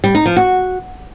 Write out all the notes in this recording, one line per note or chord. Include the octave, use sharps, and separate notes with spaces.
G3
D#4
F3
F#4